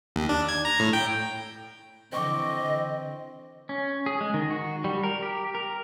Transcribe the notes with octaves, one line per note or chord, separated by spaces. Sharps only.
D#2
D4
G#6
A#5
A2
G5
D3 E3 C4 D#5 G5 C#6 D6
C#4
G#4
G#3
D#3
F#4
G3
A#4
G4
A#4